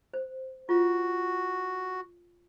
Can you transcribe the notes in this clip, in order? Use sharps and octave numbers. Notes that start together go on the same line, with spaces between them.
C5
F4 F#4